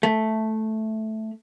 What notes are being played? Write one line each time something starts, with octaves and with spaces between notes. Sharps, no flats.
A3